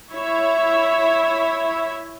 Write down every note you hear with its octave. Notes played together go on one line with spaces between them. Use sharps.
E4 C#5 E5